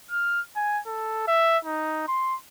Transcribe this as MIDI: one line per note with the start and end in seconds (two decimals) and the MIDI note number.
0.11 0.41 89
0.56 0.80 80
0.87 1.25 69
1.27 1.58 76
1.65 2.04 63
2.08 2.36 84